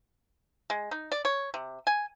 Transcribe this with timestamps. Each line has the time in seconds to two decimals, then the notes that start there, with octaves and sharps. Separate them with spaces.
0.70 G#3
0.91 D#4
1.12 D5
1.25 C#5
1.54 C3
1.87 G#5